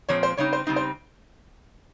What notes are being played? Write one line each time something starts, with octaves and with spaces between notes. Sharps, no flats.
A#2 F3 G#3 C4 C#5
C5
C#3 G3 C4 D#4 C#5
C5
C#3 G3 C4 D#4
C5